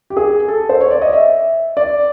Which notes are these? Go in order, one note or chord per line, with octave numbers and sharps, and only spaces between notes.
G4
G#4
A4
C5
C#5
D5
D#5
E5
D5